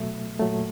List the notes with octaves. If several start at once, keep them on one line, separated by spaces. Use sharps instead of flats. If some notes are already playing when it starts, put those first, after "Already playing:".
Already playing: B2 F#3 A3 E5
A#2 F#3 A3